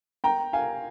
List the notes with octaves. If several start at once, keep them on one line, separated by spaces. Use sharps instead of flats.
G5 A#5
F5 G#5